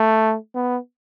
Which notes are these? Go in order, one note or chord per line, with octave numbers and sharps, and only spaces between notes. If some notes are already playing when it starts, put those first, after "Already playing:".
Already playing: A3
B3